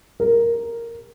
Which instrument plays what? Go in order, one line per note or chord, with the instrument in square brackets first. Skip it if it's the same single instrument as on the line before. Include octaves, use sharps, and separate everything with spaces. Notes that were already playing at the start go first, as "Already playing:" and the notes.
[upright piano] A#4